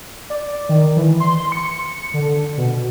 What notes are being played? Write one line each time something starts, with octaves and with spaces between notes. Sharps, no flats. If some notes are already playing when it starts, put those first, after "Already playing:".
D5
D#3
E3
C6
C#7
D3
B2